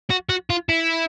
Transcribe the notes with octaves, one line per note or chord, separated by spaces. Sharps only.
F#4
F#4
F4
E4